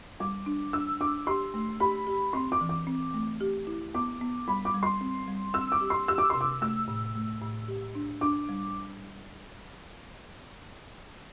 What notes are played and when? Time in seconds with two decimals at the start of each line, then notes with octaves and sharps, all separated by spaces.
0.20 G3 D6
0.46 D4
0.73 D4 E6
1.00 D4 D6
1.27 G4 C6
1.54 A3
1.80 G4 B5
2.07 G4
2.33 C4 C6
2.52 D6
2.61 E3
2.69 D6
2.87 C4
3.14 A3
3.41 G4
3.67 E4
3.94 B3 D6
4.21 B3
4.48 G3 B5
4.65 D6
4.74 G3
4.83 C6
5.01 C4
5.28 G3
5.54 C4 E6
5.72 D6
5.81 G4
5.90 C6
6.08 G4 E6
6.18 D6
6.30 C3 C6
6.41 D6
6.61 A3 E6
6.88 A2
7.15 A3
7.42 A2
7.68 G4
7.95 D4
8.21 D4 D6
8.49 G3